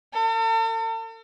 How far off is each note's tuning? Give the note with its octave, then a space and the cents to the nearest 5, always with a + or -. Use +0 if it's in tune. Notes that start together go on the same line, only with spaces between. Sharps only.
A4 +45